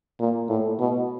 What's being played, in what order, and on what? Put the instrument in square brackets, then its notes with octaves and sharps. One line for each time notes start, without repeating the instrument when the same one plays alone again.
[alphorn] A#2
A2
B2